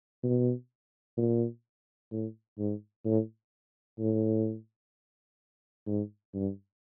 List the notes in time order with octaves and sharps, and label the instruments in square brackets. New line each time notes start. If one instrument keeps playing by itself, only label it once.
[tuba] B2
A#2
A2
G#2
A2
A2
G#2
G2